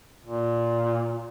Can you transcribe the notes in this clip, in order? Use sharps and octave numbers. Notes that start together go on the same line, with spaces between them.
A#2